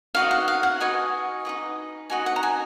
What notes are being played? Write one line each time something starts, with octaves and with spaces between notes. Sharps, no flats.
D#4 F#4 B4 D#5 F5
F#5
F5
F#5
D#4 F#4 B4 D#5 G#5
D#4 F#4 B4 D#5
D#4 F#4 B4 D#5 G#5
F#5
A#5
G#5